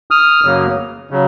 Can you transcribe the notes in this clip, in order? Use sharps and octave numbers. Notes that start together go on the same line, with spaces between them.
D#6 F6
F#2 C#3 F#3 A#3
C#3 F#3